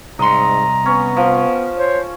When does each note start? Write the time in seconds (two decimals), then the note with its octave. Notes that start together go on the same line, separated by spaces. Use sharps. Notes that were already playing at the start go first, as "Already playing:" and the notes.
0.19 C2 G#2 D#5 A#5 C6
0.86 B3 C#4
1.16 F3
1.77 C5 C#5